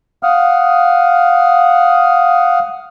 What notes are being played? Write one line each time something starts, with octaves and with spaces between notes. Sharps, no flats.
F5 F#5 D#6 F6